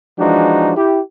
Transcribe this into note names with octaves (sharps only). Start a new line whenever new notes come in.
E3 F3 G#3 D4 D#4 F#4
E4 G4